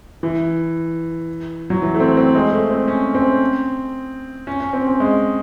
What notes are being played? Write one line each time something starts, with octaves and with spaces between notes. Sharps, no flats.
E3
F#3
E3
A3
C4
C4
G#3
A3
C4
C#4
C4
C#4
C#4
C4
C4
G#3